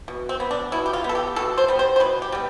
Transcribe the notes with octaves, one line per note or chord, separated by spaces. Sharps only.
B2
C4
B3
D4
B2 E4
G4
F4
B3
A4
G4
B2 A4
C5
G3 B3
C5
C5
B2 B4
G4
G3 B3